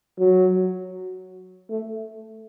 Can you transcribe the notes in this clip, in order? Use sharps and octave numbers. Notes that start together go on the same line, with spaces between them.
F#3
A3